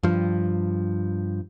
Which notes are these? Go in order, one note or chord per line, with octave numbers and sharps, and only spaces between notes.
G2 F3